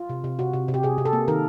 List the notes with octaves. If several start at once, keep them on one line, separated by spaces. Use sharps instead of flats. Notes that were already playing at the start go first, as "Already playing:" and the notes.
Already playing: F4
C3
C3
C3 F#4
C3
C3
G4
C3 G#4
C3
A4
A#3
D#3 A#4